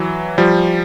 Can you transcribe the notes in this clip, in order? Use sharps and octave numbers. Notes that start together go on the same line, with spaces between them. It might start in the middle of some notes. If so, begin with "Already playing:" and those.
Already playing: E3 F#3
F3 G3